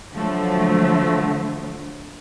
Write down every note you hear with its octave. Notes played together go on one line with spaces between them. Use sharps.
D3 F3 F#3 A3